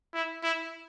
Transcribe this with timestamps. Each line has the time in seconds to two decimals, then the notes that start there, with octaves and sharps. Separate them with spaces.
0.14 E4
0.44 E4